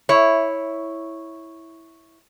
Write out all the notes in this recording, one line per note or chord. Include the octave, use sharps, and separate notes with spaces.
E4 C#5